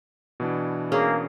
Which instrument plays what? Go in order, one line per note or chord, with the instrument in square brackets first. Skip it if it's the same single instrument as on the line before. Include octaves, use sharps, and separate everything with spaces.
[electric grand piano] B2 E3 D4
[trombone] A#3 [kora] C#4 G#4